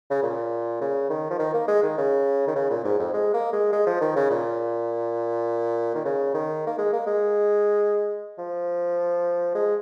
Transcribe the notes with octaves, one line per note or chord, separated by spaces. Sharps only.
C#3
A#2
C#3
D#3
F3
D#3
A#3
G#3
D#3
C#3
D#3
C#3
A#2
G#2
F2
G#3
A#3
G#3
G#3
F3
D#3
C#3
A#2
D#3
C#3
D#3
A#3
G#3
A#3
G#3
F3
G#3